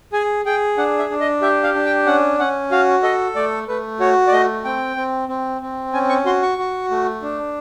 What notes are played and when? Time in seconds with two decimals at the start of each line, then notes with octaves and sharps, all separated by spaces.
0.13 G#4 G#5
0.45 G#4 G5
0.78 D4 F#5
0.99 E5
1.10 D4
1.20 D#5
1.42 G4 E5
1.63 F5
1.74 D4
1.85 G5
2.06 C#4 F#5
2.39 C#4 F#5
2.71 F#4 F5
3.03 A4 D#5
3.35 A3 D5
3.68 A3 B4
4.00 F#4 C#5
4.27 D5
4.32 A3 D#5
4.64 C4 G5
4.97 C4
5.29 C4
5.62 C4
5.93 C#4 G#5
6.09 C#6
6.25 F#4 C6
6.42 C#6
6.58 F#4
6.90 A3
7.22 D4